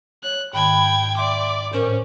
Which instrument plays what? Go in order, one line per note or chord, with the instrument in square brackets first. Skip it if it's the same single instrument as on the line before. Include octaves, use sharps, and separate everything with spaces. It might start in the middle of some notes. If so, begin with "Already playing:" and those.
[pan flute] C#5 [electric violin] F#6
[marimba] G#2 D#3 A5 [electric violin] G5 G#6 [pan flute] B5
[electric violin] D5 D6 [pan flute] E5 [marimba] C6
[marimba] A2 A#4 [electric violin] C#4 [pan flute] C5